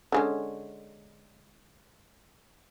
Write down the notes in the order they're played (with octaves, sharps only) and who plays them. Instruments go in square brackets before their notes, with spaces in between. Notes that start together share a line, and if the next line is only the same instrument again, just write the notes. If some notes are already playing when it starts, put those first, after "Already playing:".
[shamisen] D3 G#3 C#4